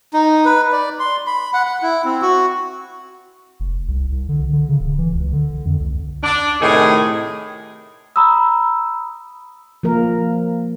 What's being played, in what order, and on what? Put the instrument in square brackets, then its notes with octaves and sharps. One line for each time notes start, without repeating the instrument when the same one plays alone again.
[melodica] D#4
B4
D5
C6
B5
F#5
F#5
E4
C4
F#4
[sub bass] F1
C2
C2
D3
D3
C#3
D1
E3
C#2
D3
F2
C#2
[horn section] D4
A2 C3 D#3 G#4
[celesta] A#5 B5 D#6 E6
[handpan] F3 A#3 A#4